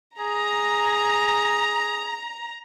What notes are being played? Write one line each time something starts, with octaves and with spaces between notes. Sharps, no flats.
G#4 A#5